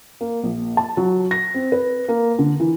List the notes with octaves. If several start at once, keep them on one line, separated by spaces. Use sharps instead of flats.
A#3
A#1
A5
F#3
A#6
C4
B4
A#3
D3
E3